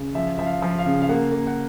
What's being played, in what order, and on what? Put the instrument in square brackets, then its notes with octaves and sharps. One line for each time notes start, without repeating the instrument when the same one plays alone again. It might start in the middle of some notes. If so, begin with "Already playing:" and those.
Already playing: [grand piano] C#3
F3 E5
F3 E5
F5
F3
F5
C#3
F5
A#3 F#5
A#3
F#5